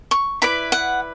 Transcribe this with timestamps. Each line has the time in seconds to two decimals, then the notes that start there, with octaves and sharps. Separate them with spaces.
0.11 C#6
0.42 E4 B4 D5 B5
0.72 F#5